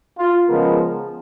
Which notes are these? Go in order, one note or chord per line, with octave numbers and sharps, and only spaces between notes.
F4
C#3 F3 G#3 B3 A#4